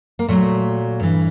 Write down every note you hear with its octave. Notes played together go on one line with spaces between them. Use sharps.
A#3
A#2 F#3 A3
G2 E3